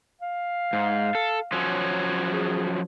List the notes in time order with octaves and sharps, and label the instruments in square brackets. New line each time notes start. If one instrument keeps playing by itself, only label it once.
[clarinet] F5
[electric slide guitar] G#2
A4
F3 F#3 C#4
[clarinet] G#4